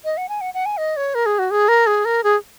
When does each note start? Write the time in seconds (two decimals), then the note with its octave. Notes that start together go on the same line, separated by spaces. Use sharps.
0.05 D#5
0.17 F#5
0.29 G#5
0.41 F#5
0.54 F#5
0.66 G#5
0.77 D#5
0.97 C#5
1.15 A#4
1.26 G#4
1.39 F#4
1.51 G#4
1.68 A#4
1.87 G#4
2.05 A#4
2.24 G#4